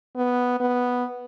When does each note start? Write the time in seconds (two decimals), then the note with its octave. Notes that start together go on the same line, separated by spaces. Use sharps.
0.16 B3
0.60 B3